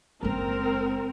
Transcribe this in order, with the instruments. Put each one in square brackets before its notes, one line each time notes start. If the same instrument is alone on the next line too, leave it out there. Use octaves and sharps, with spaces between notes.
[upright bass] F#1 G#3 [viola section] C4 A#4